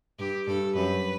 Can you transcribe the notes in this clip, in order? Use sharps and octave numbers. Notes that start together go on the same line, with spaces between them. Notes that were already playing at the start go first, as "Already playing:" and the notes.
G2 G4
G2 A4
F#2 B4